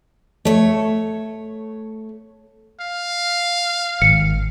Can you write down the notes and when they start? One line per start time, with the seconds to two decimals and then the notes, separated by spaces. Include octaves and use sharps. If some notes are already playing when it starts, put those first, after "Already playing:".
0.45 A3 C#5
2.81 F5
4.02 G#1 C#7